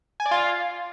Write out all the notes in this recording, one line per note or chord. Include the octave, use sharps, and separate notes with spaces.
G#5
D5
F4